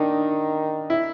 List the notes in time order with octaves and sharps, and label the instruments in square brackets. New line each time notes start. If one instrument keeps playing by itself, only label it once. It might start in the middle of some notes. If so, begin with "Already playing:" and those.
Already playing: [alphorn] D#3 [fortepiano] D4 D#4
[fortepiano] E4